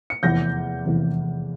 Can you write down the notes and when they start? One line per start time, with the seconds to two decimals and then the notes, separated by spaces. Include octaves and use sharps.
0.10 C#7
0.23 F1 E2 E3 G6 A#6
0.85 F1 E2 E3